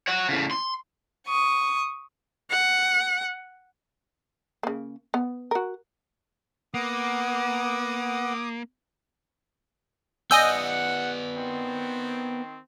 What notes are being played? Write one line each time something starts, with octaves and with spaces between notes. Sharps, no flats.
C#5 F#5
A2 C#3
C6
C#6 D#6
F#5
C#3 A#3
B3
F#4 A#4
A#3 B3 F#5 D6 D#6
B3 D5 D#5 F#5 G#5 E6 G6
D#3 C4